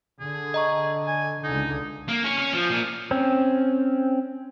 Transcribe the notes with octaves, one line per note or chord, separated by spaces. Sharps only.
D3 G#4
D#5 A#5 C#6
G#5
C#2 D3 D#4
A#3
C#4
C#4
F3
A#2
C4 C#4